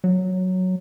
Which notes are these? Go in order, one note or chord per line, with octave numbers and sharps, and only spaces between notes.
F#3